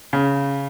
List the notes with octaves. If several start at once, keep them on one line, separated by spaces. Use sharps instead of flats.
C#3